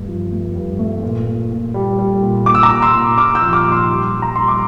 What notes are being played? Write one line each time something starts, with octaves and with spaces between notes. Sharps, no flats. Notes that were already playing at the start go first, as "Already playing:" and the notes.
Already playing: G2 A3
F3
A3
G2
A3
A#2
A#2
A#2
G3
G3
A#2
A#2 D6
E6
A#5 D6
A#2
C6 E6
A#2
A#2 D6 F6
E6 G6
F3
D6 F6
A#2
C6 E6
G3
G3
A#5
G3 C6
D6